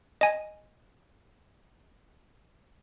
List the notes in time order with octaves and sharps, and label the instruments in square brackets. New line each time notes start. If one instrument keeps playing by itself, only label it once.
[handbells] D#5 G#5